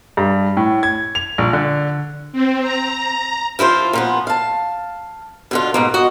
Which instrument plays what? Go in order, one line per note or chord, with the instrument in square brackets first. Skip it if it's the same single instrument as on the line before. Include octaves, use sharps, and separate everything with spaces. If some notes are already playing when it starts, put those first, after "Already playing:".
[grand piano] G2
A2
G#6
F7
A#1
D3
[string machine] C4
A#5
[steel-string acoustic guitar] F3 E4 F4 C5
A#2 F3 B3
F5 A5
B2 D3 F4
G#2 B2 A#3
F#4 D#5